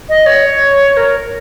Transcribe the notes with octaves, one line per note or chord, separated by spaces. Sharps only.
D#5
C#5
A#4